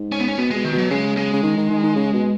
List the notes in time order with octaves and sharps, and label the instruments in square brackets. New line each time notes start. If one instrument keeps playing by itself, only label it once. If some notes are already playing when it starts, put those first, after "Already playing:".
Already playing: [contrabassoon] G#2
[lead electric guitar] C#4
B3
C#4
[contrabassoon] B2 [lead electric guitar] B3
[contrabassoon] B2 [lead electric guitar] G#3
[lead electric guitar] D#3
[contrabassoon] B2
[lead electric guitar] F#3
[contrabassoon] C#3 [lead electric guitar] G#3
[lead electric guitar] G#3
[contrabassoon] C#3
D#3
D#3
D#3
D#3
C#3
B2